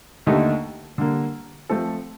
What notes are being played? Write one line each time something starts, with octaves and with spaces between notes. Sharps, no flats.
D#2 D3 A3 D#4
D3 G3 A#3
F3 A3 C4 F4 A4